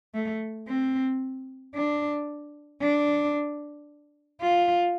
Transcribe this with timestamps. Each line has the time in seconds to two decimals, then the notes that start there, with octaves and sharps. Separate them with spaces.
0.14 A3
0.67 C4
1.75 D4
2.81 D4
4.41 F4